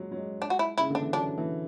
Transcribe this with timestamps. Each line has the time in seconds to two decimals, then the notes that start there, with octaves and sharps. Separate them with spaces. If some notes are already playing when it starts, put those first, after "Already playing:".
Already playing: F#3 G#3
0.11 F#3
0.17 G#3
0.42 D4
0.50 F#4
0.59 E4
0.78 C#3 E4
0.90 D3 D4
1.01 E3
1.13 F#3 D4
1.37 E3